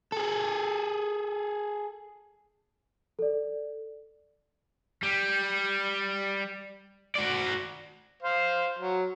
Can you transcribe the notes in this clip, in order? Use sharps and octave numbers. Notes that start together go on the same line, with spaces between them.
G#4 A4
A4 D5
G3
F#4 D5
C5 F5
F#3